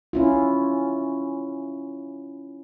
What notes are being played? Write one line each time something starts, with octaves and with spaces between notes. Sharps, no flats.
C#4 E4 F4